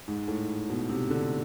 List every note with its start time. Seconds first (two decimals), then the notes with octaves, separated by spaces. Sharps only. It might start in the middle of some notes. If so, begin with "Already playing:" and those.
0.08 G#2
0.28 A2
0.69 B2
0.89 C3
1.10 D3